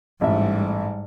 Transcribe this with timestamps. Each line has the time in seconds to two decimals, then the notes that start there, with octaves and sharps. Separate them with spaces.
0.21 A1 G#2 G3 E5